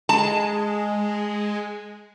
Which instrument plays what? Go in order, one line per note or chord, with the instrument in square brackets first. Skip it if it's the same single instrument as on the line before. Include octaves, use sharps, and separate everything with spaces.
[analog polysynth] G#3 [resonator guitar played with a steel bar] A5